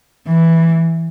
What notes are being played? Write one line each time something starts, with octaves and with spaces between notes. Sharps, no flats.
E3